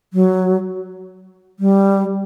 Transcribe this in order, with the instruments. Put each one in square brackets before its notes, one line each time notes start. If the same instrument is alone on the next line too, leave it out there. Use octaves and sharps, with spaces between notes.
[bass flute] F#3
G3